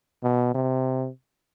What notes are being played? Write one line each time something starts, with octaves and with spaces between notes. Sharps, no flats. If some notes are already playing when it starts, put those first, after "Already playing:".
B2
C3